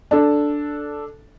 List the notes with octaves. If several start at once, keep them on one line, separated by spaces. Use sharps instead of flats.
D4 A4